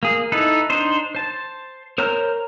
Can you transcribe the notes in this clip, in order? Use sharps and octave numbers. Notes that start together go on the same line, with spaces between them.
A#3 G#4
D#4 E4 A4 B4
D4 D#4 C5
C5 A5
A#4 C5 C#5 A#5 F6